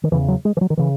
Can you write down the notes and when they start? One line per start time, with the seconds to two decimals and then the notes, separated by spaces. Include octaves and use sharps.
0.04 D#3
0.12 E2 C#3 E3
0.28 F#3
0.45 G#3
0.57 E3
0.61 F#3
0.70 D#3
0.77 C#3 E3